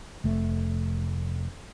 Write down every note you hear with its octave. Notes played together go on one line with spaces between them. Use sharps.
F1 A3